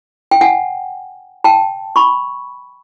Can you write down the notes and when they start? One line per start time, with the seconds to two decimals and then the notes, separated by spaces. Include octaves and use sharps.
0.31 G5
0.41 F#5 G#5
1.44 G5 A5
1.96 B5 C#6